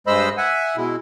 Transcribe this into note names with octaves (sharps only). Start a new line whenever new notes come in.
G2 G#3 C5 D#5 B5 E6
E5 F#5 G#5
B2 G#3 E4